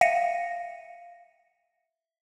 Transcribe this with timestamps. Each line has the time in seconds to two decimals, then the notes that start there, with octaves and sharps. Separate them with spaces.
0.01 E5 F5 A#6 C#7 D#7